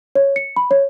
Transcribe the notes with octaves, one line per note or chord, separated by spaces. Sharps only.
C#5
C#7
B5
C#5